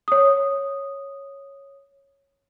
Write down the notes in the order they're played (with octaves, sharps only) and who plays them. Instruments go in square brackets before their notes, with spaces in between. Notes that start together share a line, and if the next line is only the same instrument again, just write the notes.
[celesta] C#5 D#6